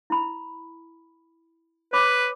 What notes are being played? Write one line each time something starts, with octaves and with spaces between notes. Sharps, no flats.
E4 B5
B4 C#5 B5 D6